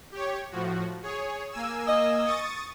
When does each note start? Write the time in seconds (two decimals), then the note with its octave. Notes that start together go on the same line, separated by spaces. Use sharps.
0.12 G4 C#5
0.51 A2 F3 F#4
1.03 G#4 C#5
1.51 A#3 G#5 E6
1.87 D#5
2.25 C#6 D#6 A6